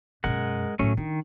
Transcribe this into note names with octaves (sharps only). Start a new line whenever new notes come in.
F#2 B2 G#3 A#4 F#5
A2 C#3 F#3 A3 C#4
D#3 D4